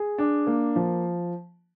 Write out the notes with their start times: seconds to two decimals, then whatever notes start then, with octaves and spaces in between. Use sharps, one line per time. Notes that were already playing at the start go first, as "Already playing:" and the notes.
Already playing: G#4
0.18 D4
0.47 A#3
0.76 F3